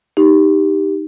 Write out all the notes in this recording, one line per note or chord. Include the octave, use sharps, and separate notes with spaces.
D#4 G4